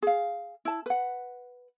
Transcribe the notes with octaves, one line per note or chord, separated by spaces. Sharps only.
G#4 F5
E4 A5
B4 F#5